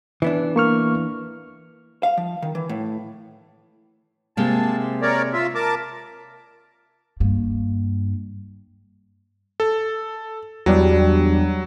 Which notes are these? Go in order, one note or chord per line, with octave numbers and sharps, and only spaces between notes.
E3 B3 D4
A#3 C#6 F6
F5
F3
D#3
E3
A2
C3 G#3 A#3 A5
A#4 C#5 D5
F4 E5
A#4 A5 D6
G2 A#3
A4
E2 F#3 G3 D4